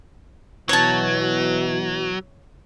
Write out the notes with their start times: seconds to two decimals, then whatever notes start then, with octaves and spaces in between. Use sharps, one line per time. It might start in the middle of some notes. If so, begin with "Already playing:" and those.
0.69 B2 E3 F#3 C#5 A5